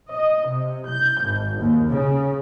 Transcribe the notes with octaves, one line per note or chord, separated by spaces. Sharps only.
D#5
C3
G6
G#1
D#2
C#3